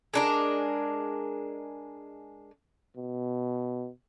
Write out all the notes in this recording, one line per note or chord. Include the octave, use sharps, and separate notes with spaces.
G#3 D4 A#4
B2